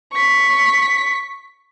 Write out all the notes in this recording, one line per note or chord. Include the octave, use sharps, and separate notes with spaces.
C#6 B6